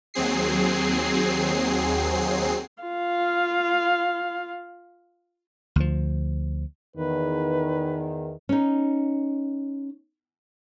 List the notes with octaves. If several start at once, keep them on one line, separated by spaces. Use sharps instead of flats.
D#2 F#3 C4 G#4 C7
F4 F5
D2 F3
E2 D#3 B4
C#4 D#4